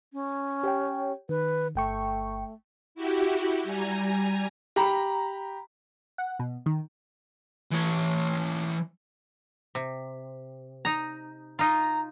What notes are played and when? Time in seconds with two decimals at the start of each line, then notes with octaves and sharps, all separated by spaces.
0.13 C#4
0.63 G4 C#5 G5
1.29 D#3 B4
1.75 G1 A3 G5 C#6
2.95 E4 F#4 G4
3.63 G3 G#5 A#5
4.76 G4 A#5 B5
6.18 F#5
6.39 B2
6.66 D#3
7.72 E3 C#5
9.75 C3
10.85 D#4 A#5
11.59 D#4 F4 A#5